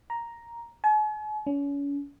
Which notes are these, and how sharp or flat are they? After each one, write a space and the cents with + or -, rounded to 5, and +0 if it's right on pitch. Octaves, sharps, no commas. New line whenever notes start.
A#5 +5
G#5 +45
C#4 +35